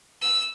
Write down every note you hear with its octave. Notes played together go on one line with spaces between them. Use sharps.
E6